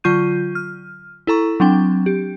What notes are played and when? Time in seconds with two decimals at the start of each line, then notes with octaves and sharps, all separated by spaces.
0.04 D3 F#3 F4 C#6 G6 D#7
0.55 F6
1.27 E4 A4 A#5 C#6
1.60 F#3 C4 D4 G5
2.06 G4